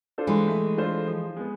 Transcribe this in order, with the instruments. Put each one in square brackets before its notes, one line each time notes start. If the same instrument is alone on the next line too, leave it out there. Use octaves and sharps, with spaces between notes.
[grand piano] D4 F4 A4 C5
[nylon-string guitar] E3 G#3
[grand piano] A3
D4 F4 A4 C5
F3
G#3 B3